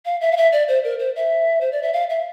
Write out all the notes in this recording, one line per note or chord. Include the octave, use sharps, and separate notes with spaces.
F5
E5
F5
E5
D5
C5
A#4
C5
E5
C5
D5
E5
F5
E5